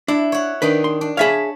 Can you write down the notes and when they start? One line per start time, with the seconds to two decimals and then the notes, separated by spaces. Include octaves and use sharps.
0.08 D4 E4
0.32 C#5 F#5
0.62 D#3 D4 D#4 B4
0.84 C6
1.01 D4
1.17 G#4 C#5 E5 F5 A5 B5